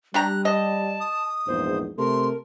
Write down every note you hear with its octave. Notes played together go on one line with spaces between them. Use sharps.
G3 D4 G4 A#5 F#6
D#5 A5
D#6
A#1 E2 G#2 C5
C3 A3 A#4 C6